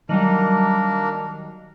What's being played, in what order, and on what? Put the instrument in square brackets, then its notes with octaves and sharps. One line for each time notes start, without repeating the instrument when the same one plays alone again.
[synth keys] D#3 F#3 G3 [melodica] A#3 D4 A#4